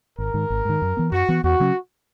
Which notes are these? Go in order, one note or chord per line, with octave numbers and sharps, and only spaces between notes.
G#1 A#4
G#2 D#3
G#1
G#2 D#3
F#2
E3 B3
F#2 F#4
E3 B3
E2 F#4
C#3 F#3 C#4